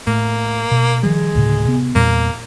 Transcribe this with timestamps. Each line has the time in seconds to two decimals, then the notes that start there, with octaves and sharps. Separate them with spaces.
0.07 A2 A#3
0.71 B2
1.03 D#3 F3 G3 G#3
1.35 D2 A2 C#3
1.65 C3 B3
1.95 E2 A#2 G3 A#3